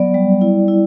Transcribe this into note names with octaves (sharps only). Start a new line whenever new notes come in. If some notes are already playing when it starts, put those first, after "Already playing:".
Already playing: F#3 B3 D5
G3
E4
E4